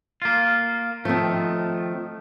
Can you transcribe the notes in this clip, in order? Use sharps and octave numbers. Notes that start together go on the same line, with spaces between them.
A#3 F4
D#3 F3 A3 C4